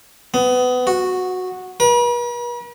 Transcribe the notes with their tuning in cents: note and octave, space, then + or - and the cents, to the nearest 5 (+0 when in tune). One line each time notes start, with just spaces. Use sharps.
B3 +25
F#4 -10
B4 -45